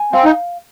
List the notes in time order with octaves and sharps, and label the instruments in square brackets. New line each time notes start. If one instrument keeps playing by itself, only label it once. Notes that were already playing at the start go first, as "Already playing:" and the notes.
Already playing: [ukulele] G#5
[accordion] C4 [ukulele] F5
[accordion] D#4